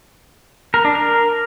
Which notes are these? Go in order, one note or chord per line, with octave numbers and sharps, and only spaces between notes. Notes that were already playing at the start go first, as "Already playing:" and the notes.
A#4
D4
A#4